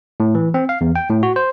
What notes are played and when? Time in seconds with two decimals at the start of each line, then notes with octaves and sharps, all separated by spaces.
0.20 A2
0.35 E3
0.54 C4
0.69 F5
0.81 E2
0.96 G5
1.10 A2
1.23 F#4
1.36 C5